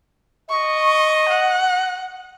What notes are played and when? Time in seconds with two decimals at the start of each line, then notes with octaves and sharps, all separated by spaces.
0.50 D#5 C#6
1.29 F#5